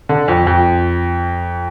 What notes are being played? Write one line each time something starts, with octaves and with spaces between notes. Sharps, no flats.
D3
F2
F2